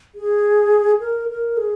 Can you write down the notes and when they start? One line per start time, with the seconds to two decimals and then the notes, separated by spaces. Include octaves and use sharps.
0.15 G#4
1.00 A#4
1.29 A#4
1.57 G#4